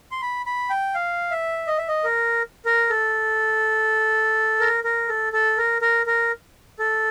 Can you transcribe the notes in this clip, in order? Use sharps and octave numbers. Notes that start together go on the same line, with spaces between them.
C6
B5
B5
G5
F5
E5
D#5
E5
D#5
A#4
A#4
A4
A#4
A#4
A4
A4
A#4
A#4
A#4
A4